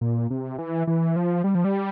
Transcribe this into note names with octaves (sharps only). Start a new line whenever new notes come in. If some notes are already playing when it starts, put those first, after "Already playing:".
A#2
C3
E3
E3
F3
G3
F3
G3